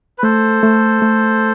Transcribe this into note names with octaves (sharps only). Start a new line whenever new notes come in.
B4
A3 A4 C5
A3
A3